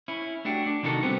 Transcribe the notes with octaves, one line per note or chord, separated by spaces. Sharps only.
C#4 E4
A3 D4 F#4 G4
D4
C3 D#3 D#4 E4 F#4 A4
G3 B3 C4 F#4 G4